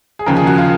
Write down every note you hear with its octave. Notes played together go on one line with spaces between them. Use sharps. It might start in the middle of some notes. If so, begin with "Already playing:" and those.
G#4
D#2 C#3 F3 A#4
G#4
F#4
F4